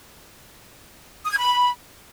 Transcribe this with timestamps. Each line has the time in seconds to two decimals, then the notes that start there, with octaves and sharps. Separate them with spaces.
1.24 D#6
1.31 G#6
1.38 B5